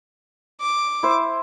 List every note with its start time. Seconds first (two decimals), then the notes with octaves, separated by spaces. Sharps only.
0.61 D6
1.03 E4 C5